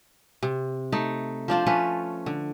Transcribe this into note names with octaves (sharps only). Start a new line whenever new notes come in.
C3
A3 D#4
F3 D4 F4 C5
F3 A3 C#4 B4
D3